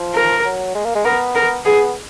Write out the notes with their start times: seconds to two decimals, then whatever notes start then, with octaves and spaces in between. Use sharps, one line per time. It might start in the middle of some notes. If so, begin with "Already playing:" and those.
Already playing: F3
0.15 A#4
0.45 F#3
0.75 G#3
0.85 A#3
0.95 G#3
1.05 B3 A#4
1.35 A#4
1.65 B3 G#4